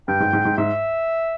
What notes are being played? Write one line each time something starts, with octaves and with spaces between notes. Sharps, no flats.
G2 G5
G#2
G#2
G#2
G#2 E5